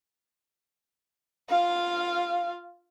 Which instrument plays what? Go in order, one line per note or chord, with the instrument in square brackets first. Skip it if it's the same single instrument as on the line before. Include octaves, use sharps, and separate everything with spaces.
[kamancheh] F4 F5